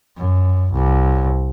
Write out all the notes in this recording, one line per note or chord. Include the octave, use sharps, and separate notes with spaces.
F#2
C2